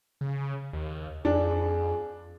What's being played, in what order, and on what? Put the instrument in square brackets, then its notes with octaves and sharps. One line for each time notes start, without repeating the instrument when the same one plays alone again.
[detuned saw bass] C#3
D#2
[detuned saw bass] F2 [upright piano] D4 [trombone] G#4